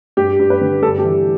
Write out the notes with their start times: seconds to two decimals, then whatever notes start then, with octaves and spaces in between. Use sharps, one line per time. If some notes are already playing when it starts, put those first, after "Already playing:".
0.17 G2 G4
0.39 G2
0.50 B4
0.61 D3
0.82 G2 A4
0.98 G4
1.04 E3